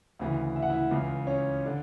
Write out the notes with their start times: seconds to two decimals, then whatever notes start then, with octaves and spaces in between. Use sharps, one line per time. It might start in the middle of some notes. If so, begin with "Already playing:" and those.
0.19 D2 C#3 E3
0.56 E5
0.63 F#5
0.70 E4 E5
0.91 C#2 C#3 E3
1.27 C#4 C#5
1.66 D3